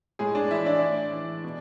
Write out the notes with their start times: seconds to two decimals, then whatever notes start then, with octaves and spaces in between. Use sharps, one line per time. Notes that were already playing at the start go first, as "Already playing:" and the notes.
0.19 A2 G#3 G#4
0.35 D4 D5
0.51 E3 E4 E5
0.66 D4 D5
0.81 A2
1.13 E3
1.44 B2